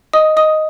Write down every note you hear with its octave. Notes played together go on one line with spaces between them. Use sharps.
D#5 D#6
D#5 D#6